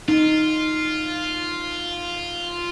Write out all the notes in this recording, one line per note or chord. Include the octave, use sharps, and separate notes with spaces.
D#4 F4